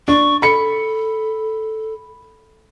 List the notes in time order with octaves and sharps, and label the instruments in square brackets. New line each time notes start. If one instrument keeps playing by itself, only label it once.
[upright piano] D4 [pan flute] C#6
[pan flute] A4 [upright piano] B5 C#7